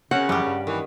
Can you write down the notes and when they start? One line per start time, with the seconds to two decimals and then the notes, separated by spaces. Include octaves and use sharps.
0.11 C#3 C4 C#4 F#4 A#4 F#5
0.29 F#2 E3 F3 G3 G4
0.47 G2
0.67 D#3 E3